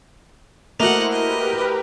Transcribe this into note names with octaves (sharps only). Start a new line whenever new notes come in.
A3 A#3 E4 F#4 A#4 C5 D#5 F#5
G4 A#4 B4 D#5